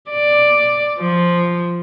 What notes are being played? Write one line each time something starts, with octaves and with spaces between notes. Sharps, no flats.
D5
F3